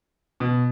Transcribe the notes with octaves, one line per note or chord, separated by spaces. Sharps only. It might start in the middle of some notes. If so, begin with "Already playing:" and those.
B2